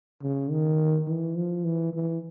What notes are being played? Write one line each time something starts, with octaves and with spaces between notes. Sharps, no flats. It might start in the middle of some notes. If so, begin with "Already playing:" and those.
C#3
D#3
E3
F3
E3
E3